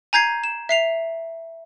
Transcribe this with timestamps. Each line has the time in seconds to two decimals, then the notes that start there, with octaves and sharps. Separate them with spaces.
0.13 G#5 A#5 G6 G#6 C7
0.44 E7
0.69 E5 C7 F7